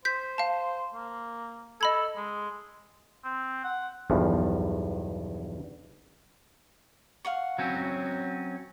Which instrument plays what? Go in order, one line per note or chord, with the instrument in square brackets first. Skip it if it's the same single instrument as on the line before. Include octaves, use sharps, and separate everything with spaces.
[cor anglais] C5 [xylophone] G6 B6
[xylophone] F5 A5
[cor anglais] A#3
[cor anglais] A4 [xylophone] D#5 B5 G#6
[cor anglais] G#3
C4
F#5
[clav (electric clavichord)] B1 E2 G2 F3
[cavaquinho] F5 F#5 C#6
[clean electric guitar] F#3 C4 C#4